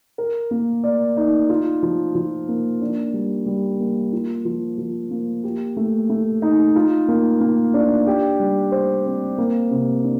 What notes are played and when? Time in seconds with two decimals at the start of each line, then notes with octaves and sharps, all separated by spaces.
0.18 A#4
0.51 A#3
0.84 D5
1.17 D#4
1.49 F4
1.83 F3
2.15 F3
2.49 A#3
2.81 D4
3.14 G3
3.46 G3
3.80 A#3
4.12 F4
4.45 F3
4.78 F3
5.11 A#3
5.44 G4
5.77 A3
6.09 A3
6.42 D#4
6.76 F4
7.08 A#3
7.41 A#3
7.74 D4
8.07 G4
8.40 G3
8.72 C5
9.05 C4
9.38 A#3
9.71 C3
10.04 D4